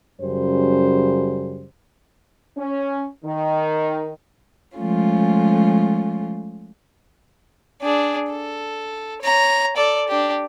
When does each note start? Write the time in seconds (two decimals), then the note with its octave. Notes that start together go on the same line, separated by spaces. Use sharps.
0.21 F#2 C#3 G3 C5
2.57 C#4
3.25 D#3
4.77 F3 G#3 A3 C#4 F4
7.82 D4 G#4
8.31 A4
9.22 C#5 A#5
9.77 A4 D5
10.08 D4 G4